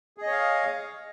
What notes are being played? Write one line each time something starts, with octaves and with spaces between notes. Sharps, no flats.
G#4 C#5 D#5 F5